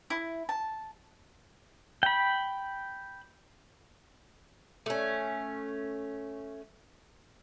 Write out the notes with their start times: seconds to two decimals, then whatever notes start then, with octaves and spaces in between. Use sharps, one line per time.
0.10 E4
0.49 A5
2.03 G5 B5
4.86 A3 C#4